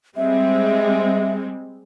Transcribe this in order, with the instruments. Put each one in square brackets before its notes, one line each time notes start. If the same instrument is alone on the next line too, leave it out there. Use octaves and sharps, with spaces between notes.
[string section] G3 G#3 C4 [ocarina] E5